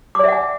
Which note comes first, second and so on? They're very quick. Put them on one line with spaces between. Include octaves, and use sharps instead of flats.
D6 D5 E5 F#5 G#5